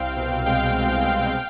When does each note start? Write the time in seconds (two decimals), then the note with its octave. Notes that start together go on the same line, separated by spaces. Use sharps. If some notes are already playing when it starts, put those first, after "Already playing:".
Already playing: C2 C4 F5 G5
0.17 B2
0.46 G#3 F5 G5
0.75 C4
1.05 C2
1.33 F5 G5